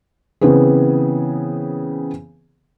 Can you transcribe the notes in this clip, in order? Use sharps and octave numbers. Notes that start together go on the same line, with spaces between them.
C#3 E3 B3 C4 G#4